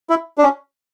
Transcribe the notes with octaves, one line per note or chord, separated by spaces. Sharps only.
E4
D4
C#4